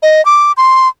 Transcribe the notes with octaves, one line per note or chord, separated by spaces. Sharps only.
D#5
D6
C6